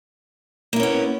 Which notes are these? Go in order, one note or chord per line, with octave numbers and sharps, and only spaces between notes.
A#3 B3 C#4 E4